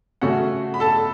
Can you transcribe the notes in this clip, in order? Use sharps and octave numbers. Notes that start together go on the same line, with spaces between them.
C#3 A3 C#4 F#4 F#5
B5
A4 A5